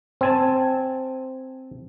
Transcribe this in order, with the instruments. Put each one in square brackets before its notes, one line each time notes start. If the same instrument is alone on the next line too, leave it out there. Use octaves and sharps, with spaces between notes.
[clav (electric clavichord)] C4 G#5 A5